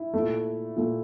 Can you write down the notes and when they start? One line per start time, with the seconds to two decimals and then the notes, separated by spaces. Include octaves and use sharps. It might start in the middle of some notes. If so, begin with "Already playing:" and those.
Already playing: E4 E5
0.14 A#2 A3
0.76 A#2 A3